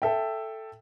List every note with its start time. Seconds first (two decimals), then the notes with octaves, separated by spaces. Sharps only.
0.02 A4 E5 G5